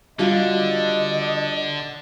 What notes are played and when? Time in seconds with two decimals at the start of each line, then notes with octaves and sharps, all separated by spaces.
0.19 D3 G3 F4 F#4 D#5